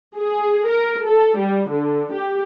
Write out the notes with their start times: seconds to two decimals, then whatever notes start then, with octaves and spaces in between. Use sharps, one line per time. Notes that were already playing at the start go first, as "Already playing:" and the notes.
0.16 G#4
0.68 A#4
1.06 A4
1.38 G3
1.70 D3
2.13 G4